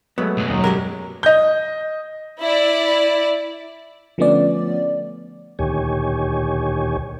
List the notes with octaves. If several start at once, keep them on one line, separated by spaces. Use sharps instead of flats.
F#3 G#3 A3 B3
B1 F#2
D#2 F#3 D#5
G#3 C#4 G4 A#4
D#5 G6
E4 D5
D3 F3 A3 B3 C#4 D5
D2 A#2 D#3 G4 C#5 G#5